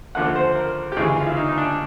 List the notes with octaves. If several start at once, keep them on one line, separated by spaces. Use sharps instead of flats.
D#2 D3 F3 A3 F#5
C5
A#4
G4
D2 C#3 E3 G#3 G#4
F4
E4
D#4
D#4
D4